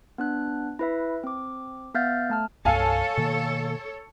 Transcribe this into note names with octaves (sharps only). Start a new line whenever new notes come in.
B3 D4 F#6
E4 B4 E5
C4 D6
B3 E5 F5 F6 G6 A6
A3 A5 F6
C2 G2 A4 C#5 F5 G#5 A5
B2 D#3 A#3